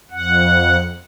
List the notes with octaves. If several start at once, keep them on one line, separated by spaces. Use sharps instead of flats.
F2 F#5